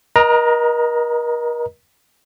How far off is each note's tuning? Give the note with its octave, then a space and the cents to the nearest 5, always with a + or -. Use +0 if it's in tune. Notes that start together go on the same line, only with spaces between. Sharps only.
A#4 +40 D#5 +0 A#5 +0